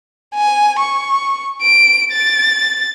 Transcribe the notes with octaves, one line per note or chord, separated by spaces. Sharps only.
G#5
C#6
D7
A6